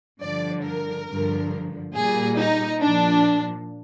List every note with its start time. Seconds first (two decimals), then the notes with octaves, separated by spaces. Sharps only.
0.21 G2 D3 F3 D5
0.64 A#4
1.08 G2 D3 F3
1.94 A#2 G3 G#4
2.37 D#4
2.80 A#2 F3 D4